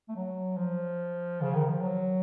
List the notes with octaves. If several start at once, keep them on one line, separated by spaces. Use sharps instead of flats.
A3
F#3
F3
C#3
D#3
F3
F#3